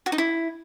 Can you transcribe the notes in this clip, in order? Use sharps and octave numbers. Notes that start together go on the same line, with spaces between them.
F#4
D#4
E4